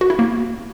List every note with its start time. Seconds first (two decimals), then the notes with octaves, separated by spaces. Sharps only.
0.01 F#4
0.10 E4
0.19 A#3